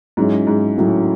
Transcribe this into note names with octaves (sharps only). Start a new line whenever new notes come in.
G#2 F#3 C#4 E4
G#2
A2 F#3 C#4 E4